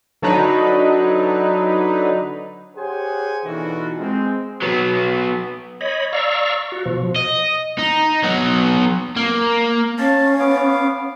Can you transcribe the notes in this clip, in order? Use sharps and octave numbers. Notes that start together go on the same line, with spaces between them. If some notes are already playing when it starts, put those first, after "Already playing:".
D3 F#3 D4 D#4 B4
G4 G#4 C5 C#5 F#5 G#5
B2 D3 E3 D#4 F4 F#4
G#3 C4
F#3 B3
C#5 D#5 B5
D5 F5 A#5 C#6 E6
F#4
B2 F3
D#5
D#4
F#3 B3
A#3
C#4 F5 A5
B3 F5 D6